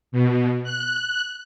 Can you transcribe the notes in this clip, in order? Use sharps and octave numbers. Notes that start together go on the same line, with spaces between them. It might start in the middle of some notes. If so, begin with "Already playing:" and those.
B2
F#6